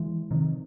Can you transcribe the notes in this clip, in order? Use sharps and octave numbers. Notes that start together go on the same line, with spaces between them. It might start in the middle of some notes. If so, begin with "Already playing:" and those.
Already playing: E3 G#3
C3 D#3